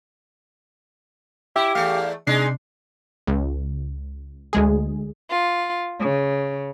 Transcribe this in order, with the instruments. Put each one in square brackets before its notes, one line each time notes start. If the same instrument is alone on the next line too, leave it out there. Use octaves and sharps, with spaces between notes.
[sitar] E4 [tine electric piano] G4 [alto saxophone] E5
[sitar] E2 A3 [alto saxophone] F5
[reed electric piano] C3 [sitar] G#3 D#4 [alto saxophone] D4 [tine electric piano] C7
[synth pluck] C#2
D2 G#3 G#4
[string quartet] F4
C#3